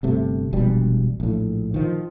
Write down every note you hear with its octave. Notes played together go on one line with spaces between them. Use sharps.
G1 C3 A3
E1 A#1 B2 G3
A#1 A2
D#3 F3